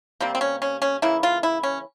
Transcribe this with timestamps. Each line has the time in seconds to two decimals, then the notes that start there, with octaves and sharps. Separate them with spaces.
0.20 C3 G3 A#3 C4
0.35 C4
0.41 C#4
0.62 C#4
0.82 C#4
1.02 C#3 E3 A#3 E4
1.23 F4
1.43 E4
1.63 C#4